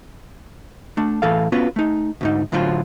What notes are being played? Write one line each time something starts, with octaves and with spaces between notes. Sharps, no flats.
A3 D4
A2 E3 A4 F5
B3 C#4 F4 F#4 B4
A3 D#4
D2 G#2 D#4
D2 A2 D3 F#3 F4 C5